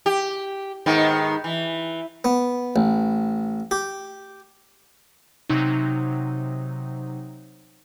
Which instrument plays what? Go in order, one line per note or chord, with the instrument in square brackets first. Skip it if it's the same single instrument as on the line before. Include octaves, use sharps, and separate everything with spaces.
[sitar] G4
G#2 D#3 B3
E3
[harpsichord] B3
A1
G4
[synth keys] C3 F#3 D#4